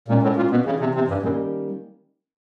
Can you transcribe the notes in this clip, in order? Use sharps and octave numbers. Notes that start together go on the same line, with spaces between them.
A#2 G#3 C#4 F#4 A#4 C#5
A2
A#2
B2
C#3 E3 G3 C4
C3
C3
G2
F#2 D#3 G3 A#3 C#4